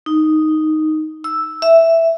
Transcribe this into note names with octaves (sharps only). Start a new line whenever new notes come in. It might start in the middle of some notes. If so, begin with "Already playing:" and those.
D#4
E6
E5